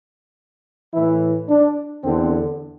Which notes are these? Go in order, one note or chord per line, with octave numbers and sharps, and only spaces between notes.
A2 E3 E4
D4
E2 D3 C4